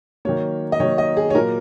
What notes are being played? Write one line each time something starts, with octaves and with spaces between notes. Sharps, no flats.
D#3 F#3 A#3 C#5
D#5
D#3 F#3 A#3 C#5
D#5
G#4
C#5
A#2 F#3 A#3 A#4